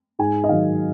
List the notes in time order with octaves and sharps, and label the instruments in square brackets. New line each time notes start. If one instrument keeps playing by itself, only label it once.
[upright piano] G#2 G#5
D#5
D#3 F#3 F5